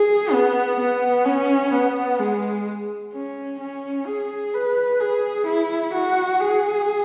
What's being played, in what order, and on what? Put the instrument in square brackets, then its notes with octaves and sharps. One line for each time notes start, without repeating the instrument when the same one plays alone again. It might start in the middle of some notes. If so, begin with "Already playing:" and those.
Already playing: [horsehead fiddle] G#4
B3
B3
C#4
B3
G#3
C#4
C#4
G#4
B4
G#4
E4
F#4
G#4